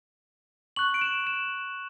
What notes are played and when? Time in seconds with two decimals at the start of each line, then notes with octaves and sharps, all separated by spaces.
0.76 C#6 F#6 F#7
0.94 D7
1.01 E7
1.27 E7